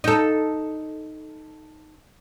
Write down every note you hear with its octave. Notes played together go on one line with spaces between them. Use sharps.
D#4 A4